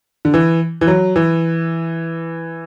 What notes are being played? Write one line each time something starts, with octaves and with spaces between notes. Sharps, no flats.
D3
E3
E3
F#3
E3